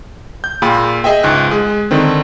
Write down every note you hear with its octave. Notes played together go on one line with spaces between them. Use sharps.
G6
A#2 A#3 F4 G#4 G5 B5
G#4 D#5 E5 G5
C#2 G#2 F#6
G#3 G#4
D3 D#3 C4